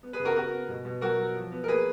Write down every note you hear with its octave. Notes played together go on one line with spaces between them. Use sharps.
B3
G#4 B4
C#3
F#4 A#4
B3 F#4 A#4
B3
B2
B2
F#3 F#4 A#4
F#3
F3
B3
A#4
A#3 G#4 B4